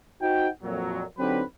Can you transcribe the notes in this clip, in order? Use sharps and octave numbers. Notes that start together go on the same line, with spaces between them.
D#4 F#4 C5 F#5 G5
F2 A#2 F#3
D3 F#3 C4 D#4 G4 B4